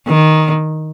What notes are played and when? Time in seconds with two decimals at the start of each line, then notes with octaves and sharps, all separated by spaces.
0.08 D#3